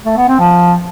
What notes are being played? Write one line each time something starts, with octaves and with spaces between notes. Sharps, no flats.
A3
B3
C4
F3